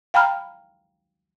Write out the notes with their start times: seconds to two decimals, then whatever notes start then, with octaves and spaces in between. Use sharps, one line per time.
0.14 F5 G5 A#5 B5 F6